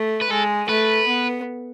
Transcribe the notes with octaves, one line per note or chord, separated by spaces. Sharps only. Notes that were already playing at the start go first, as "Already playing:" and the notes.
Already playing: A3
B4
G#3 A4
A3 B4
B3